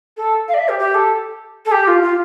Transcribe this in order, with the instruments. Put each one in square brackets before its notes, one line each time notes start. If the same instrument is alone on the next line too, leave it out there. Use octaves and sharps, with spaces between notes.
[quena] A4
F5
D5
E5
G4
G4
A4
A4
G4
F4
F4